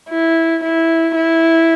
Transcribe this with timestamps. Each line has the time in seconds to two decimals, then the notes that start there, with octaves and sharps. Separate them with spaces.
0.10 E4
0.63 E4
1.16 E4